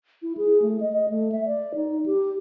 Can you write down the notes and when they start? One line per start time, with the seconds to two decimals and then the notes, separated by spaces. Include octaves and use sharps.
0.22 E4
0.37 G#4
0.62 A3
0.80 D#5
0.92 D#5
1.09 A3
1.32 E5
1.46 D5
1.75 D#4
2.06 G4